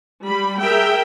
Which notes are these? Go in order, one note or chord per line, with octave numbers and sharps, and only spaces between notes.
G3 B5
G#4 A#4 E5 G5